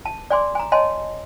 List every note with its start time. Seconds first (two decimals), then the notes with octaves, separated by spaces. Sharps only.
0.05 A5
0.30 D5 G#5 C6 D6
0.55 G#5 A#5
0.72 C#5 D#5 G#5 A5 C6